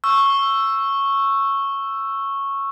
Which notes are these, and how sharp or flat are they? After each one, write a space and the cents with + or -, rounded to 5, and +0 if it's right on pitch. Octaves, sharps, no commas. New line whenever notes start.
C#6 -10 E6 +10